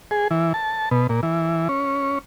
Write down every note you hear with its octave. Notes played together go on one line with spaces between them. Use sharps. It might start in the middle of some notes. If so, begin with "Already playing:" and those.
G#4
E3
A5
B2
A#2
E3
C#4